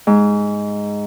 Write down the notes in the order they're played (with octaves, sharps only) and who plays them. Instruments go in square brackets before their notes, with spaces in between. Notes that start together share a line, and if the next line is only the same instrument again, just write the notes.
[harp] G#2